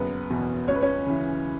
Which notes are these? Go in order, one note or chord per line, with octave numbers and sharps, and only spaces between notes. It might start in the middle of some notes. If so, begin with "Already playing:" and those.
Already playing: F#1 B3 B4
E2 B2
C#2 C#5
B4
C#4 C#5
C#3 E3